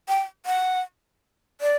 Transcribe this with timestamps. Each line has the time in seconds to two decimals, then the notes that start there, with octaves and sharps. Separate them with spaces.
0.08 G5
0.46 F#5
1.61 D5